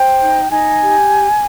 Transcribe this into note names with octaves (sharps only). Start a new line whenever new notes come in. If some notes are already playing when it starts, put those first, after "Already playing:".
Already playing: C5 G5
D#4
D#4 G#5
G4